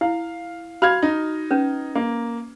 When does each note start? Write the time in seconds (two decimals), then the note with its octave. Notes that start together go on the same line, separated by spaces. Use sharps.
0.01 E4 F5
0.82 F#4 F5 B5 C6 F6 G#6
1.02 D#4
1.51 C#4 B4
1.95 A#3